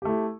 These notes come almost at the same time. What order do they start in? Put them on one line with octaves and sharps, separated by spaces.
G4 A3 E4